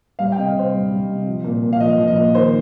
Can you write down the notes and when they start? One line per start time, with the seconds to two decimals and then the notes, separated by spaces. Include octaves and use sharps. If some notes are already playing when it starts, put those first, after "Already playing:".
0.19 G3 F5
0.32 G5
0.38 C3 D#5
0.46 F5
0.55 C3 C5
0.74 G3
0.90 G3
1.10 C3
1.27 F3
1.44 A#2
1.63 A#2
1.73 F5
1.80 F3 D#5
1.99 F3
2.08 D#5
2.16 A#2
2.35 D#3 C5